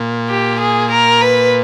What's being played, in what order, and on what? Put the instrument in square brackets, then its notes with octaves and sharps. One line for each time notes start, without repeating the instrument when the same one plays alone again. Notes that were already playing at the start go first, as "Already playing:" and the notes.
Already playing: [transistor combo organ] A#2
[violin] G4
G#4
A#4
B4